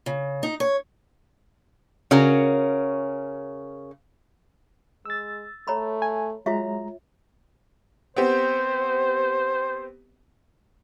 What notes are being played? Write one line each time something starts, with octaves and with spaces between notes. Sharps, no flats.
C#3
D#4
C#5
C#3 C#4 F#4 A#4
G#3 E6 A6
A3 C#5 A#5 B5
G#5
F#3 G#3 F4 C#5 E5 A#5
B3 C4 G4 C5